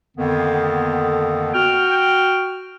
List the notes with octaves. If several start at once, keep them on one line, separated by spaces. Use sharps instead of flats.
F2 D3 D#3 A#3 B3
F#4 G5 F6